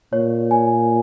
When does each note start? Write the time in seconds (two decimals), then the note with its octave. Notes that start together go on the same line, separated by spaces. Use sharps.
0.13 A#2 C#5
0.51 G#5